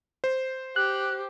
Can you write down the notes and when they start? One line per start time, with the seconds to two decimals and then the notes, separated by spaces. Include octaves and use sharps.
0.24 C5
0.76 G4 F#6